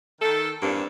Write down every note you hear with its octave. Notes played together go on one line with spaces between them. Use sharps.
D#3 A4
E2 G2 A#3 C4 D4